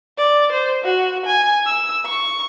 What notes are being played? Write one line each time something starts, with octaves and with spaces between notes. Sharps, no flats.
D5
C5
F#4
G#5
E6
C#6